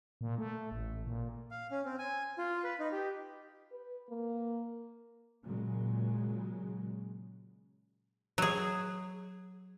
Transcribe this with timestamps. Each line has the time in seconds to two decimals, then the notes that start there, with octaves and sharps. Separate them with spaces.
0.21 A#2
0.38 A3
0.72 A1
1.07 A#2
1.51 F5
1.71 C#4
1.85 C4
1.99 G#5
2.38 F4
2.64 B4
2.79 D#4
2.92 G4
3.72 B4
4.10 A#3
5.44 A#2 C#3 F#3 G#3
8.38 F#3 G#4